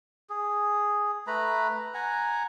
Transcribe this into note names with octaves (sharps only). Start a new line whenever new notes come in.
G#4
A3 B4 A#5 B5
F#5 G#5 A#5